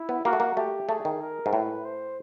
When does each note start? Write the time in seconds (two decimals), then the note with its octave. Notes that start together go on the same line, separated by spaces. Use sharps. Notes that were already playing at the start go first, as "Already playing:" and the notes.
Already playing: E4
0.09 B3
0.25 A#3 F#4
0.33 A3
0.40 A#3
0.57 A3 G4
0.88 A3 G#4
1.05 D#3
1.21 A#4
1.46 G#2
1.53 A2 B4
1.85 C5